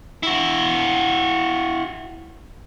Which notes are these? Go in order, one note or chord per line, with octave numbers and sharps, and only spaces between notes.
E4 F#4